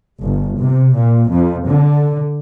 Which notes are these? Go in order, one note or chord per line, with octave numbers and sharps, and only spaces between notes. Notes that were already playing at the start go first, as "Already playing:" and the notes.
G1
C3
A#2
F2
D3